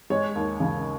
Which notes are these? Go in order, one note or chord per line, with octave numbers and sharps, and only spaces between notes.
G#3 C#5
D#2
C#3